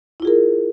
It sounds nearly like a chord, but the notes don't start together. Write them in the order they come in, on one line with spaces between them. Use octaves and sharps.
E4 F4 G#4 A#4